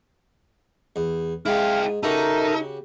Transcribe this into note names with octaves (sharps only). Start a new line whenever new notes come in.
E2
G#2 E4 G4 F5
C#3 D#4 F#4 G4 A4 A#4 E5